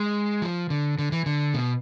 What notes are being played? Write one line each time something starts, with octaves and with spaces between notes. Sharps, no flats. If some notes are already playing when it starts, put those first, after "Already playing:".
Already playing: G#3
F3
D3
D3
E3
D3
B2